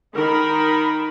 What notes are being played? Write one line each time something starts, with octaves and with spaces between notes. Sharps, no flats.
D#3 D#4 A#4 B5